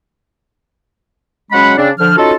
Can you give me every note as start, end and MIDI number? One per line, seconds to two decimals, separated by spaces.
1.52 1.75 49
1.52 1.75 54
1.52 1.75 56
1.52 1.75 61
1.52 1.75 78
1.52 1.75 83
1.77 1.90 49
1.77 1.90 60
1.77 1.90 62
1.99 2.17 50
1.99 2.17 53
1.99 2.17 89
2.17 2.34 61
2.17 2.34 63
2.17 2.34 65
2.17 2.34 66
2.17 2.34 69